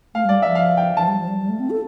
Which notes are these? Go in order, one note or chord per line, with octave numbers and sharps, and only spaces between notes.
A3 F5
G3 D5
F3 E5
F5
G5
F3 A5
G3
F3
G3
G3
A3
C4
A4